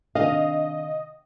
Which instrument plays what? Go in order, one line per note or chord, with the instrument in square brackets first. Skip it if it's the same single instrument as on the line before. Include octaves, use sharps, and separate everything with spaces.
[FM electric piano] C3 D#3 D4 [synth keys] D#5 [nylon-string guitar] F5